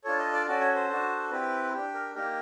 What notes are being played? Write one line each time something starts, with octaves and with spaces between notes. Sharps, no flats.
D4 F4 A4 C#5
D#5
D5
C#4 F#4 A4 D5
C#5
C5
D4 F#4 A4
C4 E4 G4 B4
D4 G4
A#4
A#3 D#4 G4 A#4